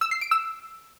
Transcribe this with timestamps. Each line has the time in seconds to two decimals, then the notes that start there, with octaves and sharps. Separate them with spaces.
0.01 E6
0.11 C7
0.21 D7
0.31 E6